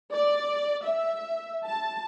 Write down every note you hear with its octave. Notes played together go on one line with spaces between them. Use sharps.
D5
E5
A5